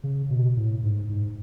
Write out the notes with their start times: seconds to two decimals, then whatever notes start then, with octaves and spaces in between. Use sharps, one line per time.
0.04 C#3
0.30 B2
0.57 A2
0.83 G#2
1.09 G#2